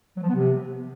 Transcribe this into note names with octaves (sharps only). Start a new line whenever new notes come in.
F#3
F3
B3
C3